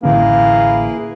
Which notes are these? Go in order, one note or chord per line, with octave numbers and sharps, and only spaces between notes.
A1 D3 A#3 C#4 E4 G#4 B4